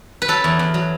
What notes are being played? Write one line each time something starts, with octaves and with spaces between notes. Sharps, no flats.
B4
F#3 A4
E2
E2
F#3